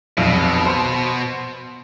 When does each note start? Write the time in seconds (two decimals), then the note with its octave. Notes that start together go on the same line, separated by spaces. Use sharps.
0.17 D#1 B1 F2 B2
0.65 C5